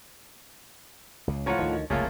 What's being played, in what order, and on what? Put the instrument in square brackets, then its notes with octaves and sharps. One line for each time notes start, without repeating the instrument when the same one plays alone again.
[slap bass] C#2 C#3
[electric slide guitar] A2 F4 F#5 [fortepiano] F3 C#5 A#5
[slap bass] D2 D#3
[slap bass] F1 C#2 [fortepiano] A3 A#3 F4 [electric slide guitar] G#4 C#5